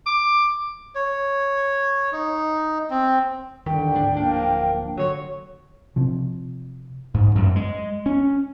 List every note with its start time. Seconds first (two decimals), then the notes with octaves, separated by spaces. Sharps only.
0.06 D6
0.95 C#5
2.12 D#4
2.90 C4
3.66 E2 G2 D3 D#3 G5
3.93 D1 G#2 D4
4.17 D1 F3 A#3 D4
4.98 D3 E3 F#3 C#5
5.96 C3 F3
7.14 G#2
7.35 F#2
7.56 G#3
8.06 C#4